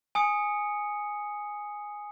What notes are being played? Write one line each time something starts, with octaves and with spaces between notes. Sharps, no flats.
G#5 D#6 C#7